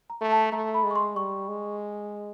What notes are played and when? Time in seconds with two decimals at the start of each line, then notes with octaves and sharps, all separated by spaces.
0.10 A#5
0.21 A3
0.32 A5
0.52 A3 A#5
0.74 B5
0.84 G#3
0.91 C#6
0.96 C6
1.16 G3 C#6
1.48 G#3